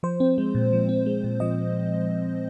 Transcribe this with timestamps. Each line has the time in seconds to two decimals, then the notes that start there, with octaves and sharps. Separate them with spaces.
0.03 F3 C5
0.20 C4
0.38 G#3
0.55 A#2
0.73 F3
0.89 C4
1.06 G#3
1.24 A#2
1.40 F3 D#5